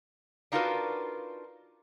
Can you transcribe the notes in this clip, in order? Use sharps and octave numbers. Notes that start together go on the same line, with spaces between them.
D4 D#4 F4 F#4 A#4 B4